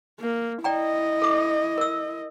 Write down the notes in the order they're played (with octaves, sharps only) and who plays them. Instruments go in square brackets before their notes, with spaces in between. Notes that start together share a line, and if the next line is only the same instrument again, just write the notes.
[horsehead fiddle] A#3
[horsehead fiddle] E4 D#5 [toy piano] D5 G5 A#5
[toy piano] A4 D6
A#4 E6